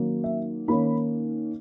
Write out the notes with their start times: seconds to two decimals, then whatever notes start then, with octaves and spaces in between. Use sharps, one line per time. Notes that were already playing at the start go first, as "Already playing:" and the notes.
Already playing: D#3 F#3 A#3 C#4
0.24 E5
0.68 D#3 A#3 C#4 B5